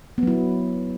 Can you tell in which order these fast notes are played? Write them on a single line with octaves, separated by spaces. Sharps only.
B3 F#3 E4